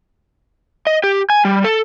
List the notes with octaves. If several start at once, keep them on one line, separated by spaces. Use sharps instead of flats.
D#5
G4
G#5
G3
A4